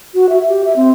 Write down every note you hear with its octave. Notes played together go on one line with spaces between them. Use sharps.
F#4
E5
G4
E5
C4